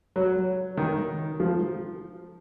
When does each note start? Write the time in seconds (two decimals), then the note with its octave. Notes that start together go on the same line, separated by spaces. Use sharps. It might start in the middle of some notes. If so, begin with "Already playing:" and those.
0.16 F#3
0.77 D#3
1.40 F3